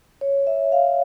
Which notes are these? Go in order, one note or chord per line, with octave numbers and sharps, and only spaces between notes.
C#5
E5
F5